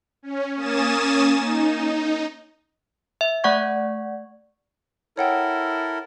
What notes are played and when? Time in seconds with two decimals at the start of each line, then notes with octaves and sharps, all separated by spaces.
0.23 C#4
0.56 A#3 C#4 G#5 D#6 A6 E7
1.41 D#4
3.21 E5
3.44 A3 D5 F#5 C#6 G#6
5.17 E4 A4 A#4 C#5 F#5 G5